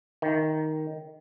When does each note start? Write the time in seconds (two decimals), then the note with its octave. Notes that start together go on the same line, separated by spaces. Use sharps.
0.22 D#3